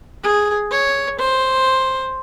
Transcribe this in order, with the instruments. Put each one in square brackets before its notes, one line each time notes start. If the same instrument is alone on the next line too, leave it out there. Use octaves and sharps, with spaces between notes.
[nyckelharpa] G#4
C#5
C5